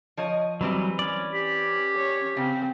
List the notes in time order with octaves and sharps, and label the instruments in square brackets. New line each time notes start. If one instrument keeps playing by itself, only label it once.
[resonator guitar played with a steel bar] F3 C#5 D#5
[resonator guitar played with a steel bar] E3 C4 B4 [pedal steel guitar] F#3 G3
[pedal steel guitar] C#4 D5
[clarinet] G4
[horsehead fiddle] C#5
[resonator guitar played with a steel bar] C#3 [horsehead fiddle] C4